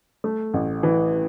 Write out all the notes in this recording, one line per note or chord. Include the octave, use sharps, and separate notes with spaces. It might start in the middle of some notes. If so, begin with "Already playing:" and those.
A3
A1
E3